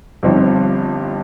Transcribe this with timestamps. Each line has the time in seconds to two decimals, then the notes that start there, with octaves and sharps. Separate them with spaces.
0.23 G1 G2 F3 C4 D#4